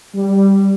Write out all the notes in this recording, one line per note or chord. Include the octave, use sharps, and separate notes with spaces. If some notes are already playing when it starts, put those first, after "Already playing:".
G3